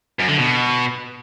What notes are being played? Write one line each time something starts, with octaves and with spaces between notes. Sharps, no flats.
F#2
D3
B2